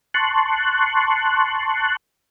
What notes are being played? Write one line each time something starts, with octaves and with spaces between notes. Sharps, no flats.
A5 C6 C#6 F#6